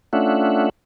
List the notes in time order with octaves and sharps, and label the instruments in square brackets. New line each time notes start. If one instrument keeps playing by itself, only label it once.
[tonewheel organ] A3 C#4 D4 F4 E5 F#5